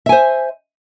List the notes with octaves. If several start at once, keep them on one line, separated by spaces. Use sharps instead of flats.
C5 E5 G#5